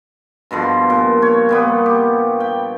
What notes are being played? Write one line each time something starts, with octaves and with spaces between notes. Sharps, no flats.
G2 B2 D3 F3
A#2
C#5
A#2 G3 B3
G4
G5